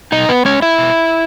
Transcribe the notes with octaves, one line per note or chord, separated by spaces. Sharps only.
B2 D#4 D#5
B3 B4
G#3 C#4 C#5
E4 E5
B2